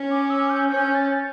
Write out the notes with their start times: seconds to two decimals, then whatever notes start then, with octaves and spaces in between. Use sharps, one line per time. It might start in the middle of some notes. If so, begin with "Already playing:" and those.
Already playing: C#4
0.11 D6
0.30 E6
0.50 G6
0.69 C#4 G6
0.95 A6